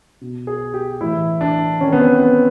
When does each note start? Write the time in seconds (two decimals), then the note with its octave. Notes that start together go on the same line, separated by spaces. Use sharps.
0.21 B2
0.47 G#4
0.74 G4
1.01 A2 E3 E4
1.41 D4
1.80 C3 D#3 C#4
1.93 B3
2.00 C4
2.20 B3